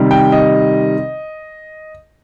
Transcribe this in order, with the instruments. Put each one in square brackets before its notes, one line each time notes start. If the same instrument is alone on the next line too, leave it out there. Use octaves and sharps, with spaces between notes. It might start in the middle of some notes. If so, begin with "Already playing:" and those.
Already playing: [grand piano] C3 D#3 G3
G5
D#5